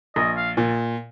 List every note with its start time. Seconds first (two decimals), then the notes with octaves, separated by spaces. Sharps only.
0.16 A#1 D#5
0.37 F5
0.57 A#2